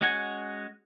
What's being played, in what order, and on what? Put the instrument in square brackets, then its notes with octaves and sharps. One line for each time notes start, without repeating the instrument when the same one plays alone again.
[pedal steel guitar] G#3 C#4 F#4 F#5 G#5